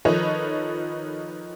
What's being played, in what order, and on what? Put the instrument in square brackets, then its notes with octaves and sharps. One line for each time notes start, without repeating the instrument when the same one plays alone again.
[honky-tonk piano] D#3 F3 D#4 A4 B4 C#5